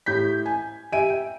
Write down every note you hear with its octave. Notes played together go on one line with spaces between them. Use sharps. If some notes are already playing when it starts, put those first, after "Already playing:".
A2 G4 G6 B6
G#5
G4 E5 G#5 D7 D#7
G5